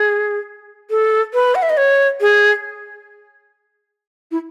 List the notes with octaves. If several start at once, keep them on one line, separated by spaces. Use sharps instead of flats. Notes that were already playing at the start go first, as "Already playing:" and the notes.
Already playing: G#4
A4
B4
F#5
E5
D#5
C#5
G#4
E4